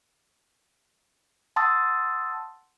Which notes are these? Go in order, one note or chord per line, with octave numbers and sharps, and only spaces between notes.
F#5 A5 C6 D#6 E6 A6